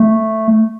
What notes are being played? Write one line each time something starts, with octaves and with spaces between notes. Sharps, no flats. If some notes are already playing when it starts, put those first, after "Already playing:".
Already playing: A3